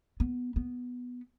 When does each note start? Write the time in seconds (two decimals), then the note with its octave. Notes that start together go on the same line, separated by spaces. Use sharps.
0.20 B3
0.56 B3